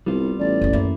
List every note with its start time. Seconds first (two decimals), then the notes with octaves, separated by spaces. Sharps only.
0.06 C2 G3 B3 F4
0.39 A1 D5
0.61 F#1 C2
0.73 F#2 E3 A#3 E4